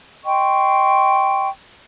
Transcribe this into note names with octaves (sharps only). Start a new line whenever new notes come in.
D#5 G5 C6 C#6